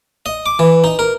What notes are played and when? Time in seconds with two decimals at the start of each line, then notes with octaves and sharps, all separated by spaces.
0.26 D#5
0.46 D6
0.59 E3
0.84 D#4
0.99 A#4